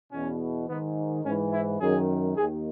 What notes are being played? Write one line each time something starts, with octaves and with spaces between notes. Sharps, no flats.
E2 B2 C#4
G#2 D#3 B3
G#2 E3 C#4
E4
F#2 D#3 G#4
D#2 D#3 G#4